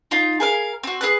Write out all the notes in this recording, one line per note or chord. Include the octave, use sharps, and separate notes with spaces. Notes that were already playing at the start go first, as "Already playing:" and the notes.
D#4 F4
G#4 A#4 F5
C4 F#4
G#4 B4 F#6